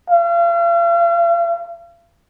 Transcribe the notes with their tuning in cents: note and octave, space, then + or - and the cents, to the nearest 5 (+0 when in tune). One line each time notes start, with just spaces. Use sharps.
F5 -40